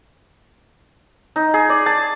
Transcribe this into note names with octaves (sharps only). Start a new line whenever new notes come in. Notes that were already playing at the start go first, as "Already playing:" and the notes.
D#4
G#4
D5
A5